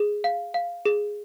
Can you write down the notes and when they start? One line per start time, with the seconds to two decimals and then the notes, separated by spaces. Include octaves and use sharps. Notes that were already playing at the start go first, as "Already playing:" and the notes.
Already playing: G#4
0.24 F5
0.54 F5
0.85 G#4